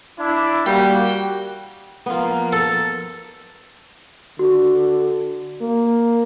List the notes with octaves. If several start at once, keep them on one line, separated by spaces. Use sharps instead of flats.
D4 E4
G3 A#3 F#4 G5
F3 A#3 B3 F4
A4
D3 F#4
A#3